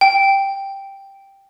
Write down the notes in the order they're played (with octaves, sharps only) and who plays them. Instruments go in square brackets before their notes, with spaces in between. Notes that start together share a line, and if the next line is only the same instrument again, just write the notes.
[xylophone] G5